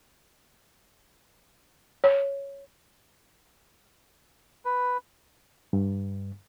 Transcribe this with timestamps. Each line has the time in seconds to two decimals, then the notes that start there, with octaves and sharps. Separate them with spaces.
2.04 C#5
4.65 B4
5.73 G2